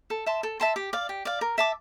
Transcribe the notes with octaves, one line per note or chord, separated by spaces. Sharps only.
A4
E5 A5 C6
A4
E5 A5 C6
G4
D5 F5
G4
D5 F5
A#4
E5 A5 D6